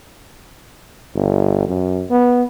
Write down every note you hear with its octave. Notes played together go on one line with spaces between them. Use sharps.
G1
F#2
B3